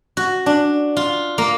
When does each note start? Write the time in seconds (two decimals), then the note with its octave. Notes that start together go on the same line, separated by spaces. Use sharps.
0.17 F#4
0.46 D4
0.97 F4
1.38 A#3